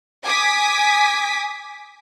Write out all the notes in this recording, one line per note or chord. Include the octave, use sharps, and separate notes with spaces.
G#5 D6 D#6 B6